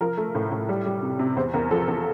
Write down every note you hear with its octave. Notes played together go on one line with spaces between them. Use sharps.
F3 A#4
A3
A2
A2
G3
G3
C3
C3
E2 C5
E2 A#4
F3 A4
E2